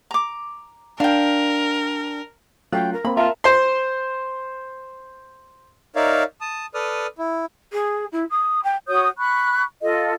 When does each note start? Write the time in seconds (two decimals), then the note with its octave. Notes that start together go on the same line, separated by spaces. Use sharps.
0.11 A#5 D6
1.00 D4 A#4 F5 G5
2.72 F#3 A3 C#4 F4 G5 F#6
2.92 A#4
3.05 A#3 C4 B5
3.17 F4 A#4 E5 A5 A#5
3.44 C5 C6
5.96 D#4 A#4 C#5 D5 E5 F5
6.41 A5 D#6
6.74 A4 B4 D5 D#6 F6
7.18 E4
7.72 G#4
8.12 E4
8.30 D#6
8.63 G5
8.88 F#4 C#5 D#6 G6
9.18 B5 C#6 F#6
9.82 F4 A4 D#5